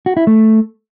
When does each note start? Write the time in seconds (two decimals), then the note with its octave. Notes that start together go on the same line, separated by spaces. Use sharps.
0.06 F#4
0.17 E4
0.27 A3